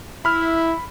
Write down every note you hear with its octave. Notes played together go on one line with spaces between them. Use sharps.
E4 B5 F6